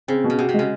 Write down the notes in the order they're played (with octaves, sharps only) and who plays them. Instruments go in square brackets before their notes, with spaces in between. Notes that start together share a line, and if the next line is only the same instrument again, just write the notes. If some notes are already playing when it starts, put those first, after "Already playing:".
[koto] C#3 [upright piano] C4
[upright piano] B2
[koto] C#3
[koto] C3 [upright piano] F#4
[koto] C3
[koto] C#3 [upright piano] G#3